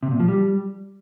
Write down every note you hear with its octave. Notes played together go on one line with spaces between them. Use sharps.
C3
A#2
F3
G3